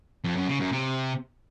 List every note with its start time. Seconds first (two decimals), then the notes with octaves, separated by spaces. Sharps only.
0.24 F2
0.36 F#2
0.48 C#3
0.60 F#2
0.72 C3